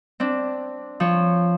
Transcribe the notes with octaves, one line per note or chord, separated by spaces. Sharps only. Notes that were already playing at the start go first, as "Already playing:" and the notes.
C4 D4
F3 C#5